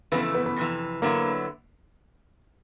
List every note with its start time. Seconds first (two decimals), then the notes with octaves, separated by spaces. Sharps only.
0.12 F2 C#3 E3 A3 B3
0.35 B3
0.46 B3
0.56 F2 C3 E3
1.02 D3 F#3 A#3 B3 E4